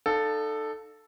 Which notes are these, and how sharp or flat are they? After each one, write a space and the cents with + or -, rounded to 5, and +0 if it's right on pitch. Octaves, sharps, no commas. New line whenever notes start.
D#4 -35 A4 +0 F5 +20